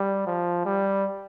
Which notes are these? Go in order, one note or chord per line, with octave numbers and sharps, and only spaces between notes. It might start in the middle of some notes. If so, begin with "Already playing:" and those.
Already playing: G3
F3
G3